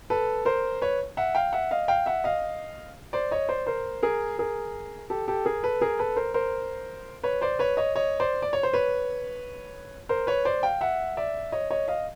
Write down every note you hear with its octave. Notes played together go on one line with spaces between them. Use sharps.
A4 B4
A#4 C5
B4 C#5
E5 F#5
F5 G5
E5 F#5
D#5 F5
F5 G5
E5 F#5
D#5 F5
C5 D5
C#5 D#5
C5 D5
A#4 C5
G#4 A#4
G#4 A#4
G4 A4
G4 A4
G#4 A#4
A4 B4
G#4 A#4
A4 B4
A#4 C5
A#4 C5
B4 C#5
C5 D5
B4 C#5
C#5 D#5
C#5 D#5
C5 D5
D5
C#5
C5
B4 C#5
A#4 C5
B4 C#5
C5 D5
F5 G5
E5 F#5
D5 E5
C#5 D#5
C#5 D#5
D#5 F5